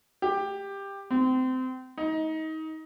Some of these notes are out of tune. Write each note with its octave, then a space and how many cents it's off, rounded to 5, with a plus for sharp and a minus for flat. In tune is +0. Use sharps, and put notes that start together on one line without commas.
G4 +15
C4 -25
D#4 +25